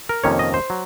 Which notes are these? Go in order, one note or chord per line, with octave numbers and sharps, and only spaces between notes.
A#4
F2 C3 D#3 A#3 C#4 C#5
D#5
C5
F#3